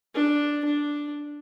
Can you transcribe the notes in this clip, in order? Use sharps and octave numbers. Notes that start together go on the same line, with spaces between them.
D4
D4